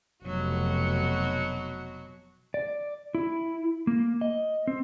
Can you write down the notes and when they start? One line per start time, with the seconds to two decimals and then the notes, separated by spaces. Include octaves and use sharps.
0.25 F1 B2 F#3 F#4
2.54 D5
3.15 E4
3.87 A#3
4.21 D#5
4.67 C4